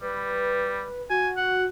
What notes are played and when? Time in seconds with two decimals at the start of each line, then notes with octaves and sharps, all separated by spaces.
0.01 G3 B4
1.10 F#4 G#5
1.37 F#5